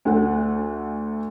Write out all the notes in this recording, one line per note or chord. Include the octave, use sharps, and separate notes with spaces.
D2 A3 F#5